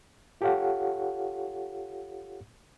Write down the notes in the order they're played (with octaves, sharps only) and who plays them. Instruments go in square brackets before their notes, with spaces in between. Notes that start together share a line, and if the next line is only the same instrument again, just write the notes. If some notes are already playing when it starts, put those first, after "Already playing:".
[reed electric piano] F4 G4 A4 C#5 F5 F#5